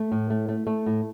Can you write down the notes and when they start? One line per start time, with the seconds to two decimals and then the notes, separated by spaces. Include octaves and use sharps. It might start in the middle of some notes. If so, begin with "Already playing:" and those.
Already playing: A3
0.12 A2
0.30 A3
0.49 A3
0.67 A3
0.86 A2